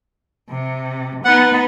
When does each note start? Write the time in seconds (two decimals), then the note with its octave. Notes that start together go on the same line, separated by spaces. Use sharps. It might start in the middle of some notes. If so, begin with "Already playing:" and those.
0.49 C3
1.25 B3 D#4 F#5